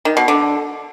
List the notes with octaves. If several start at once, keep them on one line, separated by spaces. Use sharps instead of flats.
D#3
B2
D3